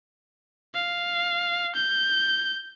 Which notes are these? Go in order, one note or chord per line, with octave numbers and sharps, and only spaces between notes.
F5
G6